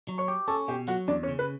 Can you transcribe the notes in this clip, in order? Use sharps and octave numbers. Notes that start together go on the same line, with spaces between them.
F#3
C#5 C#6
G4
C#4 A4 A5
B2 G4 G5
F#3 F#4 F#5
E2 D4 D5
C#4 C#5
C#3
B4